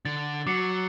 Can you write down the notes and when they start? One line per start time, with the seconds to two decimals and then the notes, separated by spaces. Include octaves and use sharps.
0.05 D3 A6
0.47 F#3 D6 C7 C#7